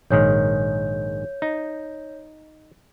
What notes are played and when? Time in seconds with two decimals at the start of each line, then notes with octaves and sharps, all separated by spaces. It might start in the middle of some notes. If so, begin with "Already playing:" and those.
0.10 A#1 G#2 D#3 C#5 G6
1.42 D#4